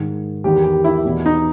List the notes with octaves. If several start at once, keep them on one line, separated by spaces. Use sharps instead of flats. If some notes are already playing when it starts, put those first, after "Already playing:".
Already playing: G#2 D#3
E2 D#3 G4
G4
E4
E2 B2
D#4